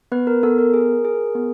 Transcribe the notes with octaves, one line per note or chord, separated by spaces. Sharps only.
B3 B4
A#4
B3 A4
A#4
G#4
G#4
B3